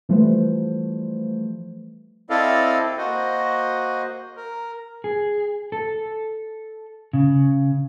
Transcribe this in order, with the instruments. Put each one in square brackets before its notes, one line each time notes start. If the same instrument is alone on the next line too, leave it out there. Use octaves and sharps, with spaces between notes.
[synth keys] E3 F3 G3 A3 B4 C5
[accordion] C4 E4 A4 D5 D#5 F5
A#3 F#4 C5 D#5
A#4
[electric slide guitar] G#4
A4
C#3